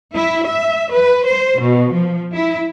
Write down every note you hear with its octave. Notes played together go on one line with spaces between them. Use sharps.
E4
E5
B4
C5
B2
F3
E4